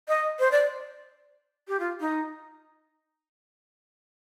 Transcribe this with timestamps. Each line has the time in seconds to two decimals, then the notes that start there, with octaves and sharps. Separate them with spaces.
0.08 D#5
0.39 C5
0.52 D5
1.68 G4
1.80 F4
2.00 D#4